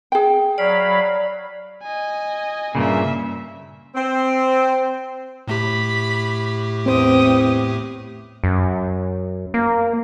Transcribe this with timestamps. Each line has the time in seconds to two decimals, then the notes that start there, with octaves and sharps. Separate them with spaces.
0.12 G#4 G5
0.58 F#3 D5 F5 B5
1.83 D#5 G#5
2.75 G2 A#2 C#3 A#3 E5
3.94 C4
5.48 A2 A3 G4 B5
6.86 E2 C4 C5 G5 D#6
8.44 F#2
9.54 A#3